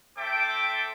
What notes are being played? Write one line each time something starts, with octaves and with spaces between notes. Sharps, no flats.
C4 A4 E5 G5 D6